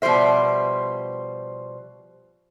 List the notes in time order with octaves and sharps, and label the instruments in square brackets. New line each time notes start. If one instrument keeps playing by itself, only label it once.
[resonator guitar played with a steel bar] B2 F3 G3 C5 E5